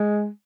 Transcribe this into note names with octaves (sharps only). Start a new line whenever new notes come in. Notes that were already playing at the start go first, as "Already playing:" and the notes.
Already playing: G#3